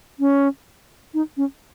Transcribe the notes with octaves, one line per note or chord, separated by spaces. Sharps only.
C#4
D#4
C#4